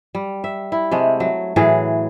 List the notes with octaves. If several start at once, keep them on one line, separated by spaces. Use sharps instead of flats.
G3
E5
E4
C3 G#3 A3
F#3
A2 E3 F#3 G#4